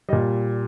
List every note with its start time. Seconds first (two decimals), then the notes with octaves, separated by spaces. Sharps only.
0.09 G3 D#5
0.13 A#2